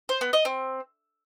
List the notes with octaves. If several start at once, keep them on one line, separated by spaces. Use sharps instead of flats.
C5
B3
D#5
C4